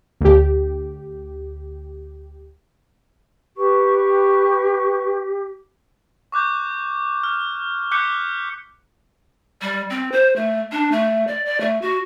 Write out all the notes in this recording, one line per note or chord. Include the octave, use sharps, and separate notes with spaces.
D2 G4
G4 B4 C#6
C#6 D6 F#6 G6
F6
D6 F#6 G6 B6 C#7 G7
G3
C4
C5
A3
D4
A3
D5
D5
A3
F#4